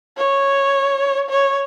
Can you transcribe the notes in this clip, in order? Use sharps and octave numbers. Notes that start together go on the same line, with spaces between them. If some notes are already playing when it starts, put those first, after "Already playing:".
C#5
C#5